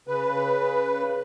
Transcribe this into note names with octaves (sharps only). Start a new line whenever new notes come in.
C#3 B4